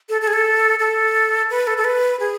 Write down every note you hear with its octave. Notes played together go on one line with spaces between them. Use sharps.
A4
A4
G#4
A4
A4
B4
A4
A4
B4
G#4